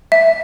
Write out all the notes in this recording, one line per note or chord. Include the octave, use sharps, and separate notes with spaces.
E5